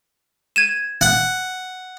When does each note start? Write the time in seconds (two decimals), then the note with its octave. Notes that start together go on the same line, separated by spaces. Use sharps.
0.56 G#6 D#7 E7
1.01 F#5